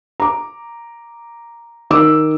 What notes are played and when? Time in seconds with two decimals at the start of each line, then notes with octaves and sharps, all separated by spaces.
0.20 A#5 D6
1.90 D#3 D6 E6